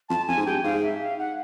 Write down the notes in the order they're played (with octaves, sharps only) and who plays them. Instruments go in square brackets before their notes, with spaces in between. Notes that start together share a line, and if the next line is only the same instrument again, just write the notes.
[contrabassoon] F2 [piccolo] A5
[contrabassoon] F2 [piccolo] G#5
[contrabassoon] G#2
[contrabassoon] G2 [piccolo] G5
[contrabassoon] G#2 [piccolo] F5
[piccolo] E5
F5
F#5